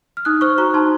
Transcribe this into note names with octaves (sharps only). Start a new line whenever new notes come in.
F6
D#4 D#6 F#6
C5 C#6 F6
F#4 A#5 C#6
D#4 A5 C6